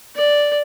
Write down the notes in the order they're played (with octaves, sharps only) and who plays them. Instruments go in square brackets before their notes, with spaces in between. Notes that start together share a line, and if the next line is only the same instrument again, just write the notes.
[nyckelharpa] D5